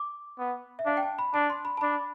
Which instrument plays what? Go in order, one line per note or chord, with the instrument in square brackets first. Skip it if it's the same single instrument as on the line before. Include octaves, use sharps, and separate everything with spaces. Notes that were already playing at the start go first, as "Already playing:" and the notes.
Already playing: [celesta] D6
[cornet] B3
[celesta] E5
[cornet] D4 [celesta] F5
[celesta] G5
A5
B5
[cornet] D4 [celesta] A5
[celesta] C6
B5
A5
[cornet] D4 [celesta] B5